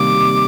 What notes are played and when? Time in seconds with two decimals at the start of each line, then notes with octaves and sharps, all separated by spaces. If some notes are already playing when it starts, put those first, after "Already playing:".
Already playing: C3 D#3 G3 A#3 D6
0.14 C3